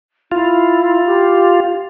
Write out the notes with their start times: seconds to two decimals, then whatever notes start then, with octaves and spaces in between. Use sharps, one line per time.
0.32 E4 F4
1.06 G4